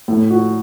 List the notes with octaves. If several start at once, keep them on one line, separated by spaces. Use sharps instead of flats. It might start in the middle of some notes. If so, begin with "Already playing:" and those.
A2
F#4